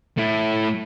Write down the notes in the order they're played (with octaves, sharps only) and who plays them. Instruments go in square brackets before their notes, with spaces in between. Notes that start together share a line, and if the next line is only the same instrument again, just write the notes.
[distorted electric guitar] A3 E4